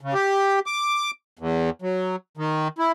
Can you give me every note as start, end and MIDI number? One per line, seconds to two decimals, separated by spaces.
0.01 0.14 49
0.14 0.59 67
0.66 1.11 86
1.39 1.70 40
1.82 2.16 54
2.37 2.68 51
2.79 2.92 64